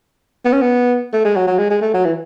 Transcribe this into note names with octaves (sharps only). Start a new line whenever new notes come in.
B3
C#4
B3
A3
G#3
F#3
F#3
G#3
G#3
A3
F#3
E3